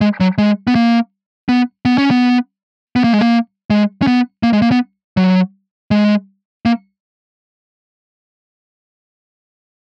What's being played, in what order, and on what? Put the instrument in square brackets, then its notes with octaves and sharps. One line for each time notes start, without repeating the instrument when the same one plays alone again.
[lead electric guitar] G#3
F#3
G#3
B3
A#3
B3
B3
C#4
B3
B3
A#3
G#3
A#3
G#3
C#4
B3
A#3
G#3
A#3
B3
F#3
G#3
A#3